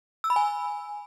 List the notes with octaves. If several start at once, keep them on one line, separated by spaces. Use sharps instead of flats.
E6
B5
G#5